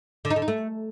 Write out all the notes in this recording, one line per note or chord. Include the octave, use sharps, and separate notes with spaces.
D3
D#4
D3
D#4
A3